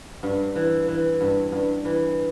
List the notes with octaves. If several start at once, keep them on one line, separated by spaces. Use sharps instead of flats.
G2
E3
E3
G2
G2
E3